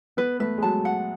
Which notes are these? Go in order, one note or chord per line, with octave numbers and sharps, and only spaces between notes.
B3 B4
A3 B4
G#3
F#3 A5
F#5